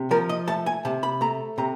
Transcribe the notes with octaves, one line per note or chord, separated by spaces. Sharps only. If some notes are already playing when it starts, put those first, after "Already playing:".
Already playing: C3
F3 A#4
D#5
A3 A5
G#5
C3 A5
B5
A3 A#5
C3 A#5